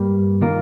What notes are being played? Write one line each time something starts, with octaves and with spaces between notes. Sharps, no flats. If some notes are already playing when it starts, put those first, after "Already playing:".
Already playing: G2 G3 A#3
D#3 A#3 F4 A#4